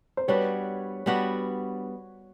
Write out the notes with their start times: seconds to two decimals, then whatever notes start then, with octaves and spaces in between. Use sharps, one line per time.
0.17 C5
0.28 G3 B3 D4 F#4 B4 C#5
1.06 G3 B3 D4 F#4